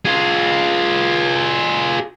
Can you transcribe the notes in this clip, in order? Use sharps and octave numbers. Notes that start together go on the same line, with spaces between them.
F4 G#4